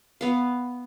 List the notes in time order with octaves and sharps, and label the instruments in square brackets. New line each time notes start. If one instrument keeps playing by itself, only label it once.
[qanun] B3 F5